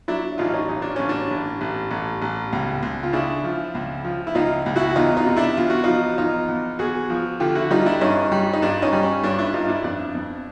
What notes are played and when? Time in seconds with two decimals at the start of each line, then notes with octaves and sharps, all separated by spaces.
0.08 F#3 D4 E4
0.38 A1 D#4 F4
0.53 C#4 D#4
0.69 A1 D#4
0.82 D4
0.96 A1 C#4
1.09 D4
1.30 A1
1.61 A1
1.91 A1
2.22 A1
2.53 C#2
2.83 C#2
3.03 F4
3.13 C#3 D4 E4
3.44 F3
3.75 C#2
4.04 F3
4.27 E4
4.35 C#2 D#4 F4
4.66 C#2
4.76 E4 F#4
4.96 E2 D#4 F4
5.17 D#4 F4
5.27 C3
5.37 D4 E4
5.57 E2 F4
5.70 F#4
5.84 F3 D#4 F4
6.18 E2 D#4 F4
6.48 E2
6.79 E2 F#4 G#4
7.09 F3
7.40 D3 F4 G4
7.55 E4 F#4
7.71 G3 D#4 F4
7.86 D4 E4
8.01 G2 C#4 D#4
8.32 G3
8.53 D#4
8.62 G2 D4
8.82 C#4 D#4
8.93 G3
9.03 C#4
9.24 G2 D4
9.38 D4 E4
9.54 G2 D#4 F4
9.69 D4 E4
9.84 F2 D4
10.15 F2